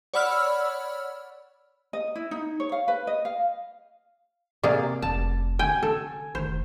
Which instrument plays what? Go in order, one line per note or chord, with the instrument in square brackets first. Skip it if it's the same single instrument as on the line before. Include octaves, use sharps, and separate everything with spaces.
[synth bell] C#5 D5 F#5 B5 E6 F6
[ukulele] D#5
E4
D#4
C#5
F5
B4
D#5
F5
[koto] C3 A#3 G#4 [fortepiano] D5
[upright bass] F1 [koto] A5
[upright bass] D3 [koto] G5 [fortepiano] G#5
[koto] A4
[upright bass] F1 D#3 [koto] C5